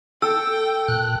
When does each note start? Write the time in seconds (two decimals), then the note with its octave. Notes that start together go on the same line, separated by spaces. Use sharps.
0.22 A4 G5 E6
0.88 A#2 F#6